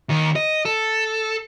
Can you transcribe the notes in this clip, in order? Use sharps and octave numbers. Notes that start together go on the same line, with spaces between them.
D#2 D#3
D#5
A4